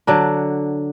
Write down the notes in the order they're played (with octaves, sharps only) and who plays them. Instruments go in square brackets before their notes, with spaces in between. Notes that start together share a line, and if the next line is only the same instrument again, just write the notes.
[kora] D3 F#3 D4